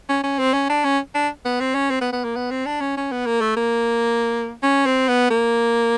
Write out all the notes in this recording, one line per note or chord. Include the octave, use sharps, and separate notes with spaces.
C#4
C#4
C4
C#4
D4
C#4
D4
B3
C4
C#4
C4
B3
B3
A#3
B3
C4
D4
C#4
C#4
B3
A#3
A3
A#3
C#4
C4
B3
A#3